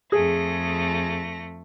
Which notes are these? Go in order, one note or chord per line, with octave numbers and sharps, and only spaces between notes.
F2 A3 G#4 A#6